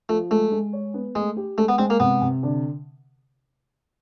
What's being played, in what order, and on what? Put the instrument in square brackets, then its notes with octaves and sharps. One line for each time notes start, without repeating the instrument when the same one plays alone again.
[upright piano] F3 [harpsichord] A3
[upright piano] G#3 [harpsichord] A3
[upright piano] G#3
C#5
B3
[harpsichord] G#3 [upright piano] A3
[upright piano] G4
[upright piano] G#3 [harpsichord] A3
[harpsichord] B3
[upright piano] G#3 [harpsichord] C4
[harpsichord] A#3
[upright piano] C3 [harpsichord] B3
[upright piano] C3
D3